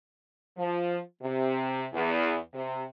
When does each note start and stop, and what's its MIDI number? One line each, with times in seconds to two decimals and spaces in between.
0.58 0.98 53
1.23 1.85 48
1.93 2.36 40
2.54 2.83 48